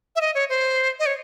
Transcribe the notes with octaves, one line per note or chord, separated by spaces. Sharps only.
E5
D#5
C#5
C5
D#5
C#5